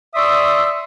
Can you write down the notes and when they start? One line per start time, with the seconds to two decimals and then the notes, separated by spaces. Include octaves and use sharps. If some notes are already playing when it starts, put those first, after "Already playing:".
0.15 D5 E5 C6 C#6 D#6 E6